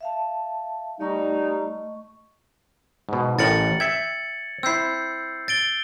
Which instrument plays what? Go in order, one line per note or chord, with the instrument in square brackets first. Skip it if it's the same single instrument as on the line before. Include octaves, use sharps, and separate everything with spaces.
[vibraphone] E5 F5 A5
[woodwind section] G3 D#4 [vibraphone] A3 D#5 C#6
[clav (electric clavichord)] G#2 B2
[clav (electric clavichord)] A1 A2 A#4 [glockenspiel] A6 C#7 F#7
[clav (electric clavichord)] E5 G5 [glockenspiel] G#6 C#7
[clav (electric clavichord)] C4 E4 [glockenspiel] E6 G6 C7
[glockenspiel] A6 D7 G7